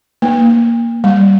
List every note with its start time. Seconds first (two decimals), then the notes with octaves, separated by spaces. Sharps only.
0.22 A#3
1.04 G3